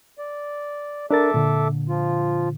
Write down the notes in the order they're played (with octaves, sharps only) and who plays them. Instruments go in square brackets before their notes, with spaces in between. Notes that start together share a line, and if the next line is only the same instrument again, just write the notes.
[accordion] D5
[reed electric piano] D4 A#4 A6 [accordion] A4 E5 D6
[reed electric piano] A#2 D3
[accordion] F3 F4